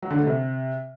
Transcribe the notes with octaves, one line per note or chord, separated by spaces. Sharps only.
F#3
D3
A3
C3